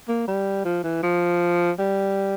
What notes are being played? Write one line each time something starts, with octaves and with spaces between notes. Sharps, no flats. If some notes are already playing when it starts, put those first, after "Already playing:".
A#3
G3
F3
E3
F3
G3